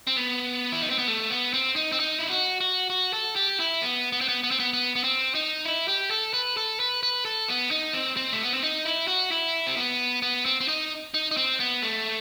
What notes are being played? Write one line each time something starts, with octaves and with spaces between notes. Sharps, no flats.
C4
B3
E4
D#4
C4
B3
A3
B3
C4
D#4
C4
D#4
E4
F#4
F#4
F#4
A4
G4
E4
B3
B3
C4
B3
B3
C4
B3
B3
B3
C4
D#4
E4
G4
A4
B4
A4
B4
B4
A4
B3
D#4
C4
C4
A3
B3
C4
D#4
E4
F#4
E4
C4
B3
B3
C4
C4
D#4
D#4
D#4
C4
B3
A3